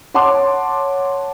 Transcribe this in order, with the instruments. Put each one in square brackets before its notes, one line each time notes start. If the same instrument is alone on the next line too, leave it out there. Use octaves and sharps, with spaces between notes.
[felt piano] C#5 F#5 A5 C6 D6